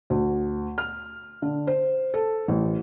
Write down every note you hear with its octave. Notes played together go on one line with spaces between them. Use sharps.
D2
F6
D3
C5
A4
A1